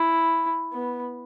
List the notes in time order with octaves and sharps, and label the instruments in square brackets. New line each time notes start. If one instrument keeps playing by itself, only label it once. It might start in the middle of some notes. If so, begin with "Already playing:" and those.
Already playing: [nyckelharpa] E4
B3